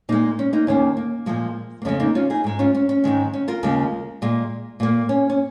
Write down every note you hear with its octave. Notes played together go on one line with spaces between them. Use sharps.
A#2 G#3 A#3 D#4
C#4
A#3 D#4
D#2 D#3 A#3 C#4
A#3
A#2 F3 G#3
A#3
F2 C#3 G#3 C#4
A#3 D#4
C#4 F4
D#4 G#4
G#2 G#3
C#4 F4
C#4
C#4
G#2 D#3 G#3
C#4
F4 A#4
D#2 C#3 G#3
A#2 G#3
A#2 A#3
C#4
C#4